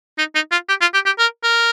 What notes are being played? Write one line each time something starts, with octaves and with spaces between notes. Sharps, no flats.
D#4
D#4
F4
G4
F4
G4
G4
A#4
A#4